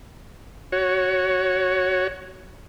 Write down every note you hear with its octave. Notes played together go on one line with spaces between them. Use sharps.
F#4 C#5